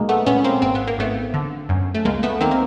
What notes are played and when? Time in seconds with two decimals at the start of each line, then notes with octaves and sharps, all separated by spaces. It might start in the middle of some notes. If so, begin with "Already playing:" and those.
Already playing: B1 G#3 A#3
0.09 A3 B3
0.26 A#2 B3 C#4
0.44 A#3 C4
0.62 G#1 C4
0.75 B3
0.87 A#3
0.98 G#1 A3 B3
1.34 D3
1.69 F#2
1.95 A3
2.05 C#2 G#3 A#3
2.23 A3 B3
2.40 D#3 A#3 C4
2.51 A#3